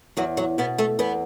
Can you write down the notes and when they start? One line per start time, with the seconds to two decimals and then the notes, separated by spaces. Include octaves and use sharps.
0.17 E2 F#3 F#4
0.37 F#3 F#4
0.58 B2 B3 B4
0.78 A3 A4
0.99 E2 B3 B4